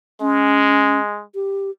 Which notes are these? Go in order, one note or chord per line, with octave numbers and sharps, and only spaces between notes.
G#3 C#4
G4